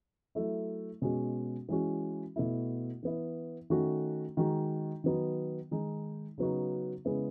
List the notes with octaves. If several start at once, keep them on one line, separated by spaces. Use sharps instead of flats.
F#3 A3 E4
B2 G#3 C#4 F#4
E3 G#3 C#4 F#4
B2 A3 E4
E3 B3 E4
D#3 A3 C#4 F#4
D#3 G#3 D#4 F#4
D#3 F#3 B3 D#4 F#4
D#3 G#3 D#4
C#3 F#3 B3 D#4 F#4
C#3 G#3 B3 E4